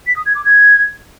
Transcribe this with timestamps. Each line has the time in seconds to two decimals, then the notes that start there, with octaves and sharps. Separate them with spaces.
0.06 B6
0.16 D#6
0.25 G#6
0.35 D6
0.44 G#6